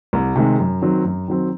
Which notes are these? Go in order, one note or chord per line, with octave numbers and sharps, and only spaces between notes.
C2
C3 D#3 G#3
F#2
D#3 F#3 C4
F#2
D#3 F#3 C4